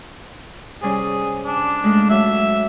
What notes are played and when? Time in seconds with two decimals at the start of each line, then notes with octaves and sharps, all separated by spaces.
0.82 C3 G3 C#4 G#4
1.46 D4
1.84 G#3 A3 F4
2.10 F#3 E5